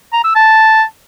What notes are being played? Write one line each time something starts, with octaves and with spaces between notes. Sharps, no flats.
A#5
E6
A5